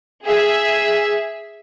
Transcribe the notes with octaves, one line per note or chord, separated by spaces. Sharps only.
G#4 E5